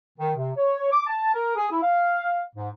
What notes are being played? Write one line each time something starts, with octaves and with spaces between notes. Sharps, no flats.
D#3
C3
C#5
D6
A5
A#4
G#4
E4
F5
G#2